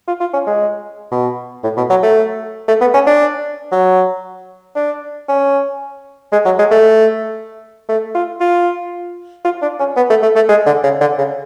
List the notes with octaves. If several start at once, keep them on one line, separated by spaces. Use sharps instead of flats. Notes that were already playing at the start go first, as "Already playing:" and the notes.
F4
F4
C#4
G#3
B2
A2
B2
F#3
A3
A3
B3
C#4
D4
F#3
D4
C#4
G#3
F#3
G#3
A3
A3
F4
F4
F4
D4
C#4
B3
A3
A3
A3
G#3
D3
C#3
D3
C#3